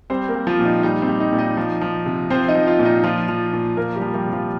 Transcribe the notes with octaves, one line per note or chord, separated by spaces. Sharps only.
G3 C4 C5
A#3 A#4
G3
F3 F4
A#2
D#4
G3 D#4
C4
G3
D#4
A#2
D#4 D#5
F3
F3
C3
F3 C4 C5
D#4 D#5
F3
F4 F5
A#2
D#4 D#5
F3 F4
F3
A#2
F3 A#3 A#4
G3 G4
F3
G3 G4
C3
F3 F4